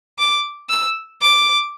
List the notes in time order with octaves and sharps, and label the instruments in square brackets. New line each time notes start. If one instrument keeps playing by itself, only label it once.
[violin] D6
E6
D6